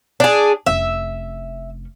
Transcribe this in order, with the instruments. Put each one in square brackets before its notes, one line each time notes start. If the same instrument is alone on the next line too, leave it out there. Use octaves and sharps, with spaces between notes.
[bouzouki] D4 G#4
[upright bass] F1 C#4 [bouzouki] E5